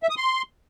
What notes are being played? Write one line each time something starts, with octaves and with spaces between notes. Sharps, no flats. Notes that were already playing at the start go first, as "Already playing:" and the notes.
E5
D#6
C6